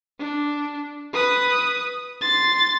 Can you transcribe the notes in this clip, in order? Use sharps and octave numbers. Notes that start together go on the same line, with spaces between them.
D4
B4 D#6
C6 A6